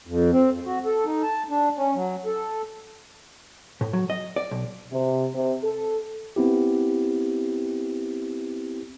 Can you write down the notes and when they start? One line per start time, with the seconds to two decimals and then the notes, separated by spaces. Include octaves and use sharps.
0.07 F2
0.32 C4
0.50 F2
0.65 F#4
0.85 A4
1.05 D#4
1.23 A5
1.49 D4
1.77 C#4
1.95 F#3
2.26 A4
3.81 A2
3.93 F#3
4.10 D#5
4.36 D5
4.51 B1
4.91 C3
5.34 C3
5.64 A4
6.36 B3 C4 E4 G4